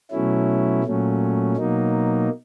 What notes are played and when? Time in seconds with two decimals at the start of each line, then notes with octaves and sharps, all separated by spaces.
0.11 B2 F#3 A3 C#4 E4
0.84 A#2 F#3 A3 C#4
1.56 B2 F#3 A#3 D#4